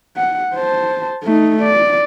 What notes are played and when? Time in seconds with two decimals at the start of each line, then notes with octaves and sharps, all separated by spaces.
0.17 F#5
0.55 C5 A5
1.24 A3 D#4
1.62 D5